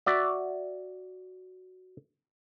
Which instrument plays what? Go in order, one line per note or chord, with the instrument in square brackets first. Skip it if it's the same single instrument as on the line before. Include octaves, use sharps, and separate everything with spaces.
[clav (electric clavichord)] F#4 D5 E5